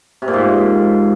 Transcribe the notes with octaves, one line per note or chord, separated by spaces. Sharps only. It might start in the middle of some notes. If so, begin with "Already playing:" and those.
C3
A#2
G#2